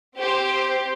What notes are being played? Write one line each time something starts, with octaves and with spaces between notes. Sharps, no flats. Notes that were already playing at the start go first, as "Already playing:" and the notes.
C4 G4 C5